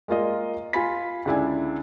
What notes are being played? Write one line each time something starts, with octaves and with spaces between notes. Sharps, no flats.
G#3 A#3 F4 D#5
F4 G#5 B5 B6
C#2 D3 D4 E4 G#5